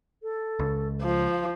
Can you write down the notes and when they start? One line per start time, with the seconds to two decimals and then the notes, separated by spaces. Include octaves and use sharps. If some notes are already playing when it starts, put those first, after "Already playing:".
0.23 A4
0.59 C#2
1.03 F3 F5